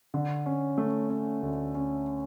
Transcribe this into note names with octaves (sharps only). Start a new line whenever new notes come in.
D3
C#4
A3
C#4
D2
C#4